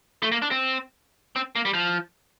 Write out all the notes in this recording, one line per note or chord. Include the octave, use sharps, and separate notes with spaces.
A3
A#3
D4
C4
C4
A#3
G3
F3